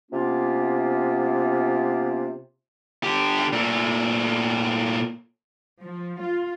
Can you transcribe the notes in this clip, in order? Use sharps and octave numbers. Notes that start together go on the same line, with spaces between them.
C3 A#3 B3 C#4 F4
D3 G4
A#2 A3
F3
F4